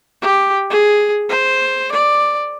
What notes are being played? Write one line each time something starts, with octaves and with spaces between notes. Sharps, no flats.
G4
G#4
C5
D5